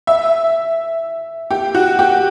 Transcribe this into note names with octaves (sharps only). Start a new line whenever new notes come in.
E5
G4
F#4
G4